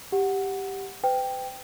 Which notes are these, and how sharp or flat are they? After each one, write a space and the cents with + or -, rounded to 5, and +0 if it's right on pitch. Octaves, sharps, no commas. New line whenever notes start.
G4 +0 F#5 +0
B4 +40 G5 +0